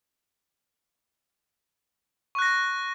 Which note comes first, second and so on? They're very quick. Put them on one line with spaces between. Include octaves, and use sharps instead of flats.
C#6 F#6 A#6